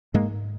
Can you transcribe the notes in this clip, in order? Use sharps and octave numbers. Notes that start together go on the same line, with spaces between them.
G#2 G#3 A#3